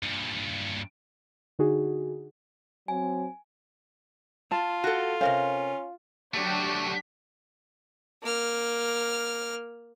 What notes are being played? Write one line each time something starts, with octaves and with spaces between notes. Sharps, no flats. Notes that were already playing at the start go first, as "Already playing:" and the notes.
G2 A#2
D3 D#4 F#4 G#4
F#3 C4 G#5
F4 A5
F#4 A4
C3 C#4 A#4 C5 F5
F#3 A3 D4 F#4 G4
A#3 F6